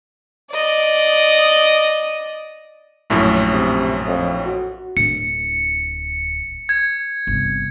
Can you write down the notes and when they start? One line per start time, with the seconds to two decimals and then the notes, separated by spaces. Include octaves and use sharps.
0.52 D5 D#5
3.10 A#1 F#2 A2
3.52 C3
4.07 F2
4.45 F#4
4.97 D1 C#7
6.69 G#6
7.27 G1 C3